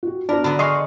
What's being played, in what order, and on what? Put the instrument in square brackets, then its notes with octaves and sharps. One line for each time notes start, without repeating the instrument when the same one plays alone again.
[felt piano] F#4 G4
[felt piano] B3 F#4 B5 [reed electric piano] D4 [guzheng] A#4
[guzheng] D3 B3 [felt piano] A#5 B5
[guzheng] G#4 F5 [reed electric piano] D#5 C6 C#6